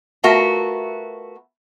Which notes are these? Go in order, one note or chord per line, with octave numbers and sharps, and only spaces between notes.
A3 B3 F4 F#4 A#4 E5